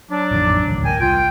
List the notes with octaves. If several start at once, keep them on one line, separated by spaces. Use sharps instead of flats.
F#3 D4
A1 F2 D#3
D#1 A1 D2
A#4 G5 G#5
C2 F4 G5